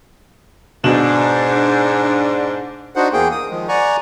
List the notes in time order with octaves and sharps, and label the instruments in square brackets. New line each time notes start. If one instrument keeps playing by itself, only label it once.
[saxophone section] G#2 D4 [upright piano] B2 E7 F#7
[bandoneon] D4 D#4 F#4 C5 F#5
E2 A#3 G#4 G5
D#6
D#3 F3 G#3
D5 F#5 G#5 A#5 C#6